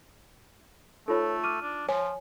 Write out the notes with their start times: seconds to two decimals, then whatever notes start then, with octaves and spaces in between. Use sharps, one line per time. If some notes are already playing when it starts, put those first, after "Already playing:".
1.08 A3 D#4 F4 A4 C5 C#5
1.44 D6 F6 D#7
1.62 D4
1.89 F3 C#5 G#5